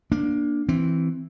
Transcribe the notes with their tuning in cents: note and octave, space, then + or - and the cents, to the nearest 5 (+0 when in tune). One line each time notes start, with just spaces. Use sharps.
A#3 +15 D4 +0
E3 +0 C4 +0